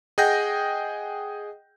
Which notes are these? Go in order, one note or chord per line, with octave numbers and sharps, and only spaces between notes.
G#4 D#5 F#5 G5 G6 A#6